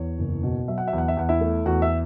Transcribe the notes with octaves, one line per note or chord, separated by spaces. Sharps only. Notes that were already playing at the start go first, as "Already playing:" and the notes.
Already playing: E2 C#5
F#1
B2
F#3 E5
F#5
E5
E2
F#5
E5
E2 F#5
E4 E5
A3
E2 F#4 F#5
E5 E6